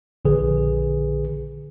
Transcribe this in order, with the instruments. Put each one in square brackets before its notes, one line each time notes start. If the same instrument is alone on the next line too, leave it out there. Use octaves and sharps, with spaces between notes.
[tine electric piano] A#1 D3 G#4 B4